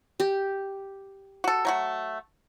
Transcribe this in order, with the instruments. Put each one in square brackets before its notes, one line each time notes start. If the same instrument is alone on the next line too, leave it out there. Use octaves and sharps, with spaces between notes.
[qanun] G4
[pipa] F#4 A4
F#3 A3 F#4